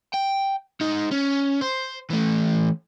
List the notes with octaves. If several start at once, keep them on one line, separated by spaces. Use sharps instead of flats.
G5
G#3 D#4
C#4
C5
E3 A3